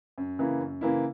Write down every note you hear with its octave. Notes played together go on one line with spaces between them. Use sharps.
F#2
C#3 E3 A#3 E4
F#2
C#3 E3 A#3 E4